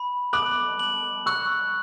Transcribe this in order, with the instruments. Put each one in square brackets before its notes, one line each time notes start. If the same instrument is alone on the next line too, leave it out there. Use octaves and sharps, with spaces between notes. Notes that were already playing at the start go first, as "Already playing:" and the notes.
Already playing: [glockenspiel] B5
[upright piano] D6 F#6 [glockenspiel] F#7
[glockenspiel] F#7
[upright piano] C#6 E6 [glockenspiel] F#6